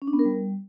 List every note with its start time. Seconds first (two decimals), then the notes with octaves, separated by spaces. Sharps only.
0.02 C#4
0.07 D4
0.13 B3
0.19 A#4
0.25 G3